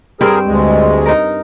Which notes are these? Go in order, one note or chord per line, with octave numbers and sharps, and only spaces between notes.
G2 C4 G#4 A#4 G5
D2 G#3
D#4 A#4